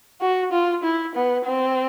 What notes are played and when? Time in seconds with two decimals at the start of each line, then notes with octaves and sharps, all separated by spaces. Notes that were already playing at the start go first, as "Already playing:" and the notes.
0.21 F#4
0.52 F4
0.83 E4
1.15 B3
1.46 C4